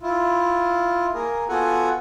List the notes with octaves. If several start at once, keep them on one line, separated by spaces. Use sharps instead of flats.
E4 F4
A#3 G#4 A#4
B3 F4 F#4 A4 F#5 G#5